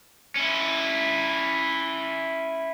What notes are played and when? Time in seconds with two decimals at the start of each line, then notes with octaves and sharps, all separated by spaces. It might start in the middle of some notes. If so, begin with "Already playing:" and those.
0.36 C#4 E4